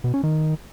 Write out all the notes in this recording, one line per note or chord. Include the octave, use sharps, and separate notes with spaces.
B2
C#4
D#3